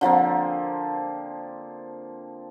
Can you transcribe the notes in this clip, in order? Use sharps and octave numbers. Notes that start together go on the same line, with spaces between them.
D3 F3 A#3 C4